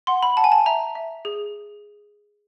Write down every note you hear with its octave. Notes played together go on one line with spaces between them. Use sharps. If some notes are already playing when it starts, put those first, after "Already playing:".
F#5 C6
B5
F#5 A5
G#5
A5
E5 A#5
E5
G#4